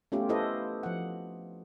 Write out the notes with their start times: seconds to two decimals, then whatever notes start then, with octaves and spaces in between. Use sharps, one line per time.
0.12 A3 B3 C#4 F4 G4
0.29 E4 F4 A4 B4 C5 D#5
0.83 F3 F#5